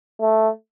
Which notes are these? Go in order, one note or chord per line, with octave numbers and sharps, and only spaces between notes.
A3